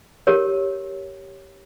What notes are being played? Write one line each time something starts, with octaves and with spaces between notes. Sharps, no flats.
G4 A#4 C#5